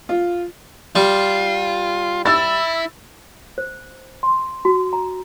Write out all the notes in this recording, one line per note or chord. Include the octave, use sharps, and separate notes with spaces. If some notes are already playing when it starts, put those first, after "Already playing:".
F4
G3 F4
E4 E6 A6
C5
C6
F#4
A#5